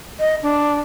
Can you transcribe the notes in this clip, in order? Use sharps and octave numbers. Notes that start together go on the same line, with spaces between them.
D#5
D4